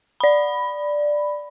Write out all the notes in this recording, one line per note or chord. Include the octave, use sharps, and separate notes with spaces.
D5 B5